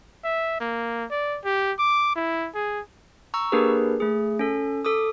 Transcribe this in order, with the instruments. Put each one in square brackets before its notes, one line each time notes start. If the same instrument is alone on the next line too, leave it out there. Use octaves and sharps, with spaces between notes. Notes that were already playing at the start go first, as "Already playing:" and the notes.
[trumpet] E5
A#3
D5
G4
D6
E4
G#4
[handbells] A#5 C#6 E6
A#3 D4 G4 G#4 A#4 B4
A3 G#4
C#4 A4
A4 D6 D#6